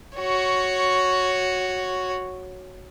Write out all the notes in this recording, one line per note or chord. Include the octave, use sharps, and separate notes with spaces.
F#4 C#5